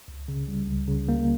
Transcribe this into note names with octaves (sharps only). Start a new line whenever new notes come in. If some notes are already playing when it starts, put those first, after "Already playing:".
C#2
C#3
G3
C#2
C#3
A#3